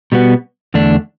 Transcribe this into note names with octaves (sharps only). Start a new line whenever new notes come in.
B2 G3 B3 F#4
E2 D3 A3 D4